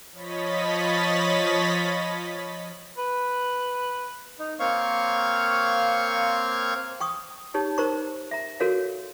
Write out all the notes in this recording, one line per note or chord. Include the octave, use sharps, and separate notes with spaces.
F3 C#5 D#5 B5 A6 B6
B4
D#4
A#3 C4 C#5 F5 C#6
G5 C#6 D#6
D#4 G4 C#5 A5
D#4 A#4 C5 A#5 C#6
E5 A#5
F#4 A4 A#4 C#5 F5